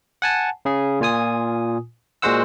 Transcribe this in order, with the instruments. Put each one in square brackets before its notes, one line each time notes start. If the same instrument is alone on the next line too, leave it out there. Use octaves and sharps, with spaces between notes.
[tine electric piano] F#5 G#5 A5
C#3 G#4
A#2 F4 G#5 D#6
A#2 G#3 F#4 C5 F#5 E6